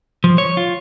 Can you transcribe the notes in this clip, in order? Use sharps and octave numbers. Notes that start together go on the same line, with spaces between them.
F3
C#5
F4